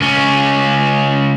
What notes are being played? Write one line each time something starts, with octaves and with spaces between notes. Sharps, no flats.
C#2 C#4